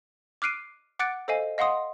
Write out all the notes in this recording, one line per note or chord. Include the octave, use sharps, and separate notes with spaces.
D6 F6 F#6 C7 D7 D#7
F#5 D6 F#6 A6 C#7 D7
A4 C5 D#5 F5 G#5
D#5 F5 F#5 C6 D#6